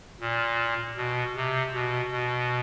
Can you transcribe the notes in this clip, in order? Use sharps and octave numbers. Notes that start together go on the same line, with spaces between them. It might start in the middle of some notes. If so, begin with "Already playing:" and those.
A#2
B2
C3
B2
B2